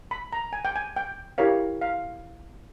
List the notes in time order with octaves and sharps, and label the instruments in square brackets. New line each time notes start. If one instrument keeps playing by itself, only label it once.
[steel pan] B5
A#5
G#5
G5
G#5
G5
E4 G4 A#4 C#5 F5
F5